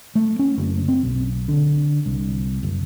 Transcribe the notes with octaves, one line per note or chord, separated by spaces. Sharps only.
A3
C#4
F#1
C4
B1
D3
C2
F#1